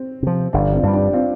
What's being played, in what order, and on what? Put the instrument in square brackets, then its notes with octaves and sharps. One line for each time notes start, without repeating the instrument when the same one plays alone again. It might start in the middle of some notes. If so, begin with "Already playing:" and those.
Already playing: [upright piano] C4
[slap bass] C3 F3
[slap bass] G1 [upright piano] D4
[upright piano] C4 F4
[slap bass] G2 G3
[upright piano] D4 G4
C4 F4